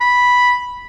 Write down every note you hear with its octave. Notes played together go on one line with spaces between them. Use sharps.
B5